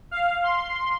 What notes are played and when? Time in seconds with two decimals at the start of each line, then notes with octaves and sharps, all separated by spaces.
0.11 F5
0.44 C6